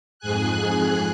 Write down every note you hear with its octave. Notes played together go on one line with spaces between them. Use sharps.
F2 G#2 G#4 G#5 F#6